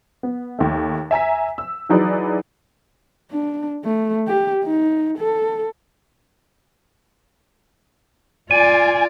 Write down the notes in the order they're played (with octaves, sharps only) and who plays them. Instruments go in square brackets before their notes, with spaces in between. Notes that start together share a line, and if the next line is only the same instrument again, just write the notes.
[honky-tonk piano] B3
D#2 A3
E5 G#5 A#5 B6
E6
E3 F#3 D#4 G#4 B4 D5
[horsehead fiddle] D4
A3
G4
D#4
A4
[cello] F4 D5 [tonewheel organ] G#5